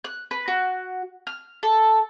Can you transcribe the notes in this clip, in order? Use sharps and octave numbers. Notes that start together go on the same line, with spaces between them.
F#6
B4
F#4
F6
A4